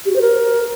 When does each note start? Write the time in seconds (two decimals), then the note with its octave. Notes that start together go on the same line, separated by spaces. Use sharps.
0.05 G4
0.10 F#4
0.15 C5
0.21 A#4